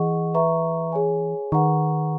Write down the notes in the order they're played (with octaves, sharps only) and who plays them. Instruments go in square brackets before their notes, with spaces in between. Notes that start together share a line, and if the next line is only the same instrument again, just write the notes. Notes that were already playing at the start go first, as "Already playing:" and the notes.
Already playing: [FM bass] E3 [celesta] G#4 D#5 F#5 C#6
[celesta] B4 E5 A#5 C#6
G#4 C#5 G#5
[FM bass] D#3 [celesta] G#4 B4 F#5 A#5 C#6